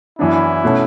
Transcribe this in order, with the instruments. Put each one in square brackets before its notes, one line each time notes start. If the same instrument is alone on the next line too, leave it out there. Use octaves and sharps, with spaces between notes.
[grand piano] F#2 E3 B3 D4 [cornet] E4
[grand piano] B2 A3 C#4 F#4